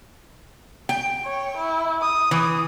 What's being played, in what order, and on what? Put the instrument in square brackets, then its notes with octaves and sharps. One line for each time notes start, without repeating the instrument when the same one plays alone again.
[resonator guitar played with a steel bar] G5
[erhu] C#5
E4
D#6
[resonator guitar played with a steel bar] E3